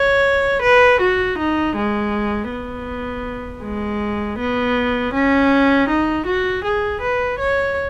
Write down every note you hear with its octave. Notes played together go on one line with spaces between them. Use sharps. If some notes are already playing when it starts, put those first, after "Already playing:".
Already playing: C#5
B4
F#4
D#4
G#3
B3
G#3
B3
C#4
D#4
F#4
G#4
B4
C#5